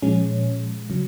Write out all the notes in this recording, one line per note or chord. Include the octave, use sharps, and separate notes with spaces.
A#2 F3 G#3 C#4
C#3 F#3